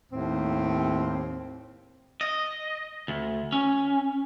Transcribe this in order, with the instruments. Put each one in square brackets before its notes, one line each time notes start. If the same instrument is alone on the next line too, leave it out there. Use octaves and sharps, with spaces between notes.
[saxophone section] D#2 A2 C4
[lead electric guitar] D#5
D2
C#4